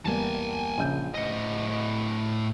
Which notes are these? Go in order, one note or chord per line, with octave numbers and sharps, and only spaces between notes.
E2 G3 A#3 G#5 A5
A#1 C#3 G6
A2 D#5 A#6 C#7